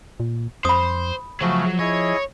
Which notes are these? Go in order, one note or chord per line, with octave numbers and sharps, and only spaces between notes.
A#2
F2 C5 B5 D#6
C#3 F3 F#3 A3
E4 G#4 C#5 D#5